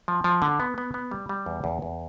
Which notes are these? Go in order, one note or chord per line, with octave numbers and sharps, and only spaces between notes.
F3
F3
D3
B3
B3
B3
G3
G3
E2
E2
E2